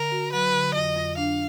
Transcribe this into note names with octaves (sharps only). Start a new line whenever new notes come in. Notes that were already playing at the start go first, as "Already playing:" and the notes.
Already playing: D3 A#4
F#4
F#3 B4
D3
F2 D#5
F2
D4 F5